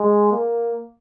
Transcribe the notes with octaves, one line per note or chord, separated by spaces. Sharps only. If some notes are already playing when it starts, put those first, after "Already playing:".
Already playing: G#3
A#3